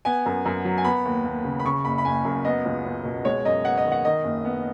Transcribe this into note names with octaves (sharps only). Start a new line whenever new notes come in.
B3 G#5
F#2
F#2
F#3
G#5
B3 B5
D#2
D#2
C#3
B5
C#3 C#6
F#1 B5
B5
F#1 G#5
F#2
B3 D#5
C#2
C#2
B2
G#3 C#5
F#2 D#5
B3 F#5
D#5
D#3
F#5
D#3 D#5
F#1
B3